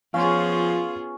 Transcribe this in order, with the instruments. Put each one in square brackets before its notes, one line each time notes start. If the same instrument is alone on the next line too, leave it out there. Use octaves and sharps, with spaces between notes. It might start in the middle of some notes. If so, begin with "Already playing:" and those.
[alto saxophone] F3 [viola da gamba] B3 F4 G#4 [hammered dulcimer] C#4 C#5 [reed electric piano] F5 C6